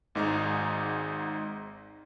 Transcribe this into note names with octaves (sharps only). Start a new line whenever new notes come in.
G#1 G#2 D#4 G#4 A#5